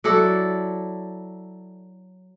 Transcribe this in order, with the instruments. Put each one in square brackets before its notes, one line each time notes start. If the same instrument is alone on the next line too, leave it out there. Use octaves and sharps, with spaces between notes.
[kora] F#3 E4 A4 D5